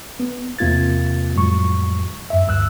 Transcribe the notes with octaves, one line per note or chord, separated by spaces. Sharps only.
B3
E2 C3 A#3 F4 G#6 A6
F2 A2 F#3 G#3 C#6
F#2 E5
D2 G2 E6 F#6